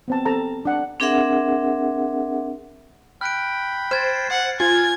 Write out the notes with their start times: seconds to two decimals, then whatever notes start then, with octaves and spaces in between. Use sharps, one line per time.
0.08 B3 C4 A5
0.25 C4 A4 A5 A#5
0.65 D4 F#5
1.00 C4 D4 G#4 A#4 E5 F#5
3.21 G5 B5 F6 F#6 D7
3.91 C5 F6 G#6 A6
4.30 F#5
4.60 F4 G#5 G#6